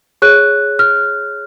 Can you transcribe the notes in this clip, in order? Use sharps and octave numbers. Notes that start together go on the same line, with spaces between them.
G#4 C#5 F#6
F6